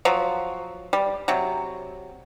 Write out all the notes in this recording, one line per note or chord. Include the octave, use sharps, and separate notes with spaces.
F3 F#3
G3
C3 F#3